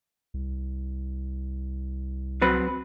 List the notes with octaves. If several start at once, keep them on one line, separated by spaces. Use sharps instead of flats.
C2
F#3 C4 B4